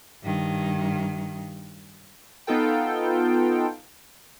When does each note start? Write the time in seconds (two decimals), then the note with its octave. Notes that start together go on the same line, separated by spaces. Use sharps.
0.23 G2 D#3
2.47 B3 D#4 F4 A4 G5